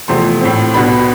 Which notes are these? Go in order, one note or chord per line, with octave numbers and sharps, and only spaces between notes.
E2 C3 F3 A3 C4 C6
A2 F3 C4
C2 B2 B3 D4 B5